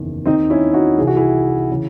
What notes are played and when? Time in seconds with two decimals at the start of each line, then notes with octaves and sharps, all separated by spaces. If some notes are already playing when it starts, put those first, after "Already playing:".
Already playing: F#1 E2 D#3
0.26 D#2 D#3 C4 D#4
0.50 C#4 E4
0.74 D#4 F#4
0.98 C2 C3 E3 G#4
1.07 F#4
1.16 E4 G#4
1.71 C#3 E3